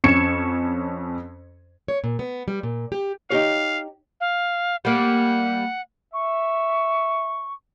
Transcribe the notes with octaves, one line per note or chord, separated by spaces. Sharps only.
F2 C#4 C#6 G#6 C#7 E7
C#5
A#2
B3
G3
A#2
G4
D#4 G4 C#5 F5
F5
G3 A#3 F#5
E5 C#6